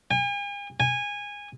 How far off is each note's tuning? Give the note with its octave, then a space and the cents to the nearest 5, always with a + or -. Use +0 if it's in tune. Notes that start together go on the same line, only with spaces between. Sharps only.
G#5 -45
G#5 -20